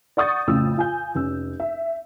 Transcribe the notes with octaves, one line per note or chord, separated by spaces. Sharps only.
D5 F#5 C#6 D#6 G6 A6
F2 A2 C#3 E6
F4 G#5 G6
F1 C#4 E6
E5